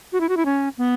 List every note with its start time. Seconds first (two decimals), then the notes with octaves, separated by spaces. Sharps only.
0.12 F#4
0.21 E4
0.29 F#4
0.37 E4
0.45 C#4
0.78 B3